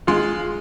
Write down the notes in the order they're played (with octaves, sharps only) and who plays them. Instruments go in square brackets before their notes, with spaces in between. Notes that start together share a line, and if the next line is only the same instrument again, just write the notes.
[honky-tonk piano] G#3 [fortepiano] F4